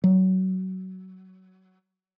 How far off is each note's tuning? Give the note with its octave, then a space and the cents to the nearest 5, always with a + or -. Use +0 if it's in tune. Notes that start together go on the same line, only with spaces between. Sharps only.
F#3 +20